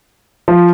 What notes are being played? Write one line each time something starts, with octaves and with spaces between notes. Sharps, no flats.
F3